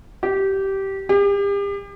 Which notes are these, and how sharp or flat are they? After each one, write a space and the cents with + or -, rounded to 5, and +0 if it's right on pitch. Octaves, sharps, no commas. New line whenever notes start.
G4 -15
G4 +40